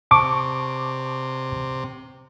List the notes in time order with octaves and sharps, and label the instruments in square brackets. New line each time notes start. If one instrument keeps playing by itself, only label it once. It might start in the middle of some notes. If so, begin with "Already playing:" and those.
[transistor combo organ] C3 [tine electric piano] A5 C#6 D6